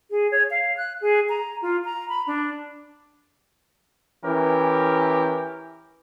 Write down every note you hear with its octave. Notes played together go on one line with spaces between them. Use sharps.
G#4
C#5
F5
F#6
G#4
A#5
F4
A#5
B5
D4
E3 C#4 G4 A#4